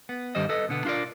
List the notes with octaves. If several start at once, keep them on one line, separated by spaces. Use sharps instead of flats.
B3
G2 D3 D#3 G3 C5 D#5
A4 B4 D#5
B2 D3 B3
D4 F4 F#4 A#4 D5